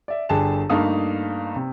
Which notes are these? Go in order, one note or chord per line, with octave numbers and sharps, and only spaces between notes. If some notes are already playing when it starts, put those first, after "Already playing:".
D5 E5
G1 D3 G4 G#4 A5 E7
G2 A3 A#3 D#4 F5 D#6
C3